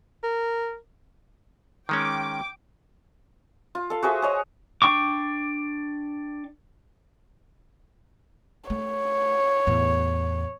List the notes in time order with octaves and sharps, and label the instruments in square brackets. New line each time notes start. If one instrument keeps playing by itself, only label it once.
[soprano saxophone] A#4
[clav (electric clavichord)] D#3 G#3 C#4 [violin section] G5 D6
[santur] F4
A4 F5
F#4 G#4 C5 E5
G#4 C#5 D#5
[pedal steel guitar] D4 G5 C#6 D6
[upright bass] A3 [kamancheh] C#5
[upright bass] E2 A2